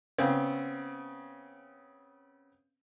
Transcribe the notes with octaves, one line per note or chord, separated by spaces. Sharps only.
C#3 B3 C4